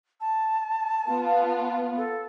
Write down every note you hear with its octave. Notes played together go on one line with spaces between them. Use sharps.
A5
B3 F4
A4